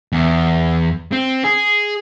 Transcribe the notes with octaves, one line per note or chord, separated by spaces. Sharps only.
E2
C4
G#4